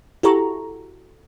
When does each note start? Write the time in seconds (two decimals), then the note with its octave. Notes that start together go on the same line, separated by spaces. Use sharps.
0.23 E4 F#4 G4 A4 A#5 C#6